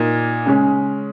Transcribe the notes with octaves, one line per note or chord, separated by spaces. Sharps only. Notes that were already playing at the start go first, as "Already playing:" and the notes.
Already playing: A#2 A#3 D#4
C#3 G#3 C#4